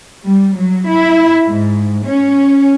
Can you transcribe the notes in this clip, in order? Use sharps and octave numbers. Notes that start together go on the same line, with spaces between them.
G3
F#3
E4
G#2
C#4